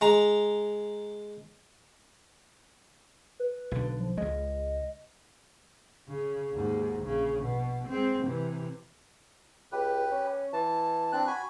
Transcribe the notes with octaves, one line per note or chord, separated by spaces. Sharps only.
G#3 A#5
B4
B1 D3
F3
C#2 G#3 D#5
C#3
D#2 G#2
A#1 C#3
B2
G#3 C4
C3 E3
C#2 G4 B4
C#4
E3 A5
C4 D4 F#6
F#4 G#5 B5